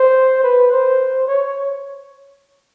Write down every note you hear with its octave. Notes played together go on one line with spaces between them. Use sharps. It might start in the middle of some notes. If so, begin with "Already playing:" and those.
Already playing: C5
B4
C5
C#5